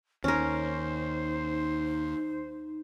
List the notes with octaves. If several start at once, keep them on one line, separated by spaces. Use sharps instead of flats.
D#2 C#4 D#4 A#4 C5